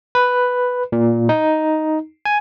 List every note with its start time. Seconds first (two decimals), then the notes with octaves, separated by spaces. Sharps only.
0.15 B4
0.92 A#2
1.29 D#4
2.25 G#5